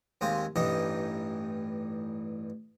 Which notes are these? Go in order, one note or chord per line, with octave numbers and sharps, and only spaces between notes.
D#2 G#3 C4 G4 F5 G#5
A1 G2 E3 D#4 G4 D#5